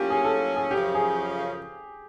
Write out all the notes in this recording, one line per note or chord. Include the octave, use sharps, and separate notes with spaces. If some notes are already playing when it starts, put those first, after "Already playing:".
Already playing: A2 F#3 A#3 C#4 F4 G4
G#4
A4
G#4
F#2 C#3 F3 G4
G#4